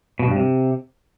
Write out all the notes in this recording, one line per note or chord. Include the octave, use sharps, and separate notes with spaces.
B2
G2
C3